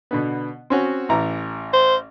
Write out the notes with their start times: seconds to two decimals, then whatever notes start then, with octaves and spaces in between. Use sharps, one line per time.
0.11 B2 D3 B3
0.70 C4 C#4 F#4
1.09 A1 E3 A#5
1.73 C5